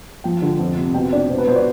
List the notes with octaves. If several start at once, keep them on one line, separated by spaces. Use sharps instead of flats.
F3 G5
D3
F2
C3
B2 G5
D4 D5
B2 C5
B4
B2 C5
D5